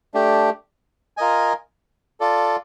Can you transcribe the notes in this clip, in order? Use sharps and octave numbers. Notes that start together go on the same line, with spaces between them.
A3 D4 G4
F4 A#4 D#5 G#5
F4 A4 D5